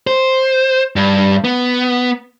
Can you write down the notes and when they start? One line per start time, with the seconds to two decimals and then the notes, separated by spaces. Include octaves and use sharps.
0.07 C5
0.96 G2
1.44 B3